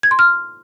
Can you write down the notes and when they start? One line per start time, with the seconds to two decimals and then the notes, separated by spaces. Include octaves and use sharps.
0.03 G#6
0.11 C6
0.19 F6